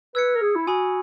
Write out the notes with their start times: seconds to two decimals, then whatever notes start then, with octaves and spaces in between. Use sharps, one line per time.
0.15 B4 E6 G#6 C#7
0.36 A#4
0.41 G#4
0.56 E4
0.67 F#4 G#5 B5 D#6